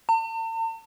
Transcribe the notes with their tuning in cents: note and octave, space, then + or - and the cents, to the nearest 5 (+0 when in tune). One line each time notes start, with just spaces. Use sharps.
A5 +45